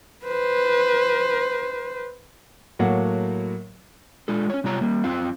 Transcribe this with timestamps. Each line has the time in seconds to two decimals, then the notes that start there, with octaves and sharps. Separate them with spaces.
0.25 B4 C5
2.79 A2 F#3 A#3 F#5
4.28 G#3 F4 A4
4.50 C#4 C#5
4.64 C3 G3 F4 C#5 A#5
4.81 G3 A#3
5.04 F#2 C4 F4 F5